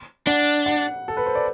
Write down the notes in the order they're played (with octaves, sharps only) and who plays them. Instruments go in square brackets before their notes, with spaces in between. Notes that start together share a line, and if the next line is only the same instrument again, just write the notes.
[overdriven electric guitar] D4 [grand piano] F#5
[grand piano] F#5
A4
B4
C5
D5